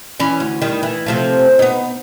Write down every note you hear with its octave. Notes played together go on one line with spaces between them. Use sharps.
E3 C#4 D5
D2
D#3 G3
E3
C3 F3 A3
B3 D#4